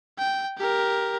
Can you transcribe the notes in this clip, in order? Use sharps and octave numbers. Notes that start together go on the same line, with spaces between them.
G5
G4 A#4